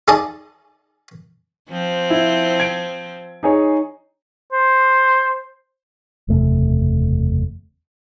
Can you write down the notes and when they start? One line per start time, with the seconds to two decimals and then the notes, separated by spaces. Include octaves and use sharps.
0.08 D#4 G#4 D5 D#5 A5 D#6
1.70 F3 C4
2.10 E4
2.60 G#6 D7
3.43 D#4 G#4 C#5
4.52 C5
6.28 F#1 E2 C3 A3